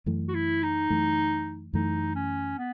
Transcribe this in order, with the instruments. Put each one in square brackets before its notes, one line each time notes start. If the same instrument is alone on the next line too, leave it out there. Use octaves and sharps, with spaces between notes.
[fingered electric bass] F#2 E3 A3
[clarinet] F#4
E4
D#4
[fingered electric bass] F#2 E3 A3
[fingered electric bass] F#2 E3 A3 [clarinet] D#4
[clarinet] C#4
B3